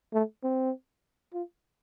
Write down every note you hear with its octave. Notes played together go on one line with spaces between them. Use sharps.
A3
C4
F4